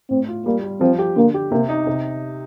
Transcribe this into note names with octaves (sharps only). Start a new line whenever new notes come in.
A2 C4
F4
G3 A#3
G3
F3 C4
G4
D3 A#3
G4
C3 A#3
D#4
C3